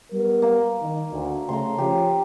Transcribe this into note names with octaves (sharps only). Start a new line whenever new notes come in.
G3 B3 A#4
A#3
D#3 D#4
D2
C#3 A3 A#5 C6
F3 C#4 G4